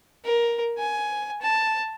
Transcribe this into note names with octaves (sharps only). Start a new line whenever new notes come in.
A#4
G#5
A5